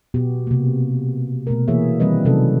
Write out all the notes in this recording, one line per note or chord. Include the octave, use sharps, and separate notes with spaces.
B2 B3 F#4 G4
C3 A#3
B2 A3 A#4
E3 A#3 G#4 C#5 E5
D#3 E3 G3 C4 B4 D#5
C3 F#3 C#4 E4 A4